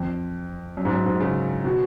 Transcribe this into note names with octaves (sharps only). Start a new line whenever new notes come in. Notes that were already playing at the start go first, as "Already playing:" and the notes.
Already playing: F2
F#2
G#2
F#2
G#2
C#3
B2